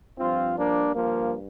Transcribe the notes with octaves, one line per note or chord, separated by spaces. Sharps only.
G2 F3 C4 F4
A#3 D4
F3 A#3